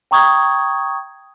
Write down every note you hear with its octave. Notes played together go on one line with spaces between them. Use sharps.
G5 A#5 C#6 D#6 G#6